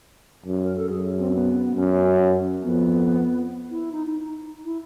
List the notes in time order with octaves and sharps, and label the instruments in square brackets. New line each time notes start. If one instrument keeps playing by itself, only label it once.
[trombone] F#2
[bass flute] A#4
A4
[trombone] F#2 [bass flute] G#4
[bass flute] C4
B3
[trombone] F#2 [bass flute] C#4
[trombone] F2 [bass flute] B3
[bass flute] E4
D#4
D#4
D#4
E4